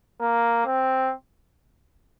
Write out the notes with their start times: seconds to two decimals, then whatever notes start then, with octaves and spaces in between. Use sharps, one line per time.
0.21 A#3
0.66 C4